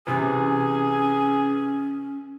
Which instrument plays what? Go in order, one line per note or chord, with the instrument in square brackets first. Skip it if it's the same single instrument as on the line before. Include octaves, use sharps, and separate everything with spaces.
[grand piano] C3 E3 [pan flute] C#4 [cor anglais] G#4